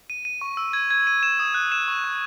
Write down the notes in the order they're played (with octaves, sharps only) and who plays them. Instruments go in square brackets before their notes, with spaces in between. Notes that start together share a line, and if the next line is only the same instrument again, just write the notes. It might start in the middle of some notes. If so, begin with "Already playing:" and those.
[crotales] D#7
D#7
C#6
E6
G#6
G#6
D#7
E7
D#6
F#6
E7
C#6
F#6